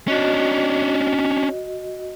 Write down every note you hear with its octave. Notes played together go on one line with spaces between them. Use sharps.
C#4 D4 F#4 D#5